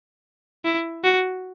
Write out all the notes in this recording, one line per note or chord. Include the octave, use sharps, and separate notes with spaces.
E4
F#4